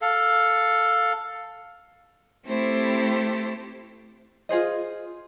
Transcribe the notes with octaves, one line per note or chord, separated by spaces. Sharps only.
A4 F5
A3 C4 E4 G4 A4 C5
F4 G#4 C5 D#5